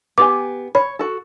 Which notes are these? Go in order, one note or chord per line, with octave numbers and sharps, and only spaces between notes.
B3 G4 G#5 D6
C#5 B5
F#4 A4